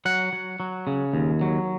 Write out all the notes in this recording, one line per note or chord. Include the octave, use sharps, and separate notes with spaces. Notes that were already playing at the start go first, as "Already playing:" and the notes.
F#3 F#5
F#3
F#3
C#3
D#2
F#3